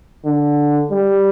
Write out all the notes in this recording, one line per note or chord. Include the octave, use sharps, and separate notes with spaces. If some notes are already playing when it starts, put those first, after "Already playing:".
D3
G3